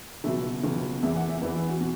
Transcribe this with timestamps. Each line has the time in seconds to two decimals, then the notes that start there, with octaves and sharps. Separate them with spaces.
0.24 C#2 B2 F#3 E5
0.64 C#2 B2 F#3
1.02 E2 E3 E5
1.16 F#5
1.29 E5
1.41 E2 B4
1.44 E3
1.55 E4
1.68 F#4
1.80 B2 F#4